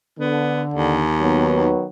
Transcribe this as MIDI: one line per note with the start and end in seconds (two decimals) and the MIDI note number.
0.19 1.02 50
0.19 0.63 59
0.74 1.70 39
1.21 1.87 51
1.21 1.87 54
1.21 1.87 59